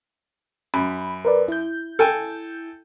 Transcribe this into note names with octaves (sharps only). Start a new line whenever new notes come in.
F#2 B5
A#4 B4 D5
E4 G6
A4 G5 G#5